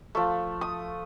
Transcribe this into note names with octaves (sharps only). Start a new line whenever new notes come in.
F3 A3
D#6